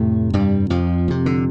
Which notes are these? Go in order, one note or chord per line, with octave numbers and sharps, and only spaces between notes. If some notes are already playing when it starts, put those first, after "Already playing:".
Already playing: F2 A2 C3 A3
G2 G3
F2 F3
F2 C3
D3